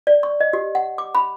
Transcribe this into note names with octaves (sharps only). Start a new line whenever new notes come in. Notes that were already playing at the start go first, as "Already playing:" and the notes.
D5
C#6
D#5
G4
F#5
D6
B5